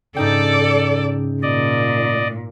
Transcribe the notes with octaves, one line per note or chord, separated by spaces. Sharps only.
G#2 C#3 D#4 A4 D5 G5
A#2 D5 D#5